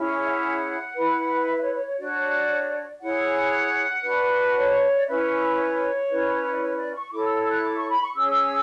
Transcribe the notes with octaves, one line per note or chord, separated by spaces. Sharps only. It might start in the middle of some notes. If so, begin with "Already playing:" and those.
Already playing: C#4 E4 G#4 C#5
E5
F#5
E4 B4
F#5
E5
C#5
C#5
C#5
D4 F#4 C#5 D5
E4 G#4 C#5 F#5
D4 F#4 B4
C#5
D5
C#4 E4 B4 E5
C#5
C#4 E4 B4
D5
C#5
D5
C#6
E4 A4 C#5 D6
E6
E6
F#6
D6
C#6
B5
C#6
C#4 G#4 C#5 E6